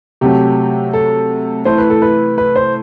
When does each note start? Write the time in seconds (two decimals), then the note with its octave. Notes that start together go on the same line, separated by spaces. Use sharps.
0.21 C3 F#3 A3 G4
0.93 A4
1.65 E3 A3 E4 C5
1.78 B4
1.90 A4
2.02 B4
2.38 B4
2.56 C5